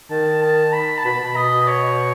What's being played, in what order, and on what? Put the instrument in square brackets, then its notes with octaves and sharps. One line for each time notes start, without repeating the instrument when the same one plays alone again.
[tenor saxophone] D#3 [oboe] A5
[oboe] A5
B5
A5
[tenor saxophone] B2 [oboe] B5
[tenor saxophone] B2
[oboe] D#5
C#5